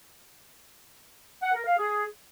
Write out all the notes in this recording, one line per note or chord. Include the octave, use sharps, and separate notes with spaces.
F#5
A#4
F5
G#4